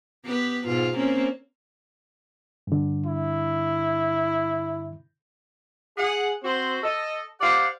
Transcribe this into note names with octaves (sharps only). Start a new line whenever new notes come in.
B3 G4 B4
G#2 B2 F4
A#3 C4 C#4
G2 D3
E4
G#4 F#5
C4 F#4 C5
A4 D#5
G4 C5 D5 F5 F#5